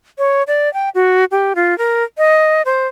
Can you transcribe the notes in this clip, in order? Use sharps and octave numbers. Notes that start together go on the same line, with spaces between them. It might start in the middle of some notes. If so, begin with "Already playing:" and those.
C#5
D5
G5
F#4
G4
F4
A#4
D#5
C5